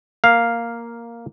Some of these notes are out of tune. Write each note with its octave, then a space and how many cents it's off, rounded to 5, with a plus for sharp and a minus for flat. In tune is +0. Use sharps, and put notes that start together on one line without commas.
A#3 +0 F5 +0